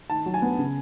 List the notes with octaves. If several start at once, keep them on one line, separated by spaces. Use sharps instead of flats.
D#3 A5
F#3
G#5
B3
C#3